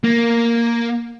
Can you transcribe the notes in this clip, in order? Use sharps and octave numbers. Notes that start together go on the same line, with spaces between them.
A#3